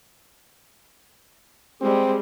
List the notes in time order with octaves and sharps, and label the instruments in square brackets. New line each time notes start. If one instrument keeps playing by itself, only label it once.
[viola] G3 G#3 [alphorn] C4